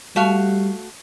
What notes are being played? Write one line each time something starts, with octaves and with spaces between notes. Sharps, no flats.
G3 A3 F#4 F5